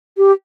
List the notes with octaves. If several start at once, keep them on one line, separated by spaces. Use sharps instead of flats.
G4